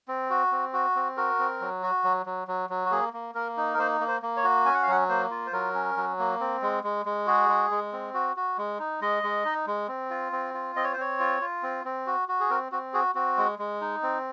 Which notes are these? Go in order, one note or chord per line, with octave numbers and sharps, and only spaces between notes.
C4
F#4
C4
F#4
C4
F#4 A#4
C4
F#3
F#4
F#3
F#3
F#3
F#3
F#4
A#3 G#4
A#3
A#3 A#4
D#4
A#4
A#3 C5
A#3
C5
A#3
C#5
F#4
C#4 G#5
F#5
F5
F#3 F#5
A#3 C5
F4
C5
F#3 A#4
C#4
F#3
A#3
C4
G#3
G#3
G#3
F#4 G#4
G#3
G#3
C4
F#4
F#4
G#3
D#4
G#3 D#5
G#3
D#4
G#3
C4
F4
C4
F4
C4 D#5
C#5
C5
C4 C#5
F4
F4
C4
C4
F#4
F#4
G#4
C4 A#4
C4 F#4
F#4 G#4
C4 F#4
G#3
G#3
D#4
C4